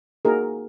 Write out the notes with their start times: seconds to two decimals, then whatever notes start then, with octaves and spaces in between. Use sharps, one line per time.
0.25 A#3 D#4 F#4 G#4 A#4